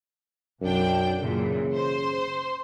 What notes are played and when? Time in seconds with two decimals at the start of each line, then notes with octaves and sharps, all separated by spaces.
0.61 B1 F#2 D4 G5
1.21 F#2 A#2 C#3 E3
1.74 C5 C6